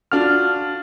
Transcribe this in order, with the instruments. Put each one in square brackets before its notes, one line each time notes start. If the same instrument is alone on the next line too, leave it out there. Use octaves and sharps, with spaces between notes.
[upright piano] D4 F4 F#4 [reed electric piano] F6